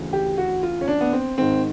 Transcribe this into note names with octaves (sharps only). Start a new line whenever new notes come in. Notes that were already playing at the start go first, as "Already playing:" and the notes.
Already playing: D2 C#3 E3
G4
F#4
F4
C#4
D4
B3
C4
G#2 D#3 C4